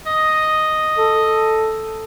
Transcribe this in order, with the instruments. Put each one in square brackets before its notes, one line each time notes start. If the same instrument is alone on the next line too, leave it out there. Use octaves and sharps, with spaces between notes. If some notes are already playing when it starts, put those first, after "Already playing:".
[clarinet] D#5
[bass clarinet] A4